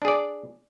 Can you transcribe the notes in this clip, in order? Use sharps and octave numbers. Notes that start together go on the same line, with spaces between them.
D4 G#4 D5